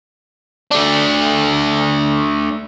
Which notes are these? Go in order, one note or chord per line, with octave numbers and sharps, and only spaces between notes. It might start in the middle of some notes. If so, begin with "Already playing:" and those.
A3 D4